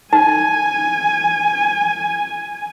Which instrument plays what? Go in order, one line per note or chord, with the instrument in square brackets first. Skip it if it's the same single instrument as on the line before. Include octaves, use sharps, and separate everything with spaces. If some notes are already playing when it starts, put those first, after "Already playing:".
[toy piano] D#4 [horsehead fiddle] G#5